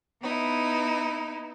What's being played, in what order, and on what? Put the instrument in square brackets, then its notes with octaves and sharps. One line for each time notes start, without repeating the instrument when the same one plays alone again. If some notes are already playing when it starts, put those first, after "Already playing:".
[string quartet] B3 D#4 E4